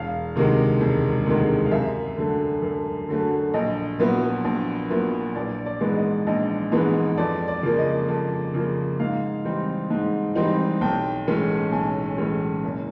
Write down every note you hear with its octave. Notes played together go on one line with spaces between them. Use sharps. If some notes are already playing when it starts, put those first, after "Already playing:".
Already playing: E1 F5
D2 C3 D#3 G#3
E1
D2 C3 D#3 G#3
F5
F#2 E5
D3 F#3 A3
F#2
D3 F#3 A3
A#1 D#5
A#2 F#3 B3 E4
A#1
A#2 F#3 B3 E4
A#1 D5
D5
G#2 E3 G#3 B3
D#5
A#1 D#5
G#2 E3 G#3 B3
F2 D5
D5
C#3 F3 A#3
D#5
F2
C#3 F3 A#3
G#2 F5
E3 G3 C4 D#4
G#2
E3 G3 C4 D#4
B1 G5
A2 E3 G#3 C#4
B1 G#5
A2 E3 G#3 C#4
F#1